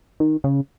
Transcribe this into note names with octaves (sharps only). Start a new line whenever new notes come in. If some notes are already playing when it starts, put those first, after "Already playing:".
D#3
C#3